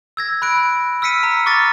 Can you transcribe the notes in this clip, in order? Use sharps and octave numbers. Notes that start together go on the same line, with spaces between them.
E6 G#6 A#6
B5 F#6 D7
E6 F6 B6 C#7 D#7
A#5
C#6 D6 F6 A6 A#6